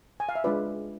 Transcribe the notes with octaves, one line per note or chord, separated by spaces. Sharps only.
G#5
F5
E5
G#3 D4 F4 B4 D5